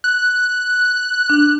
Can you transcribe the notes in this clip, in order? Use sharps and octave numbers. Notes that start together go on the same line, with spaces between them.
F#6
D4